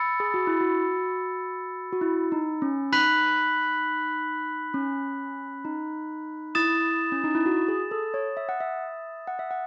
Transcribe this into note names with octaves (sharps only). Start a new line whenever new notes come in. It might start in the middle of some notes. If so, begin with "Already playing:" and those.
Already playing: B5 E6 A6 C#7
G#4
F#4
E4
F#4
F#4
E4
D#4
C#4
D#4 B5 F#6 B6 F#7
C#4
D#4
E4 D#6 A6 E7
C#4
D#4
E4
F#4
G#4
A4
C#5
E5
F#5
E5
F#5
E5
F#5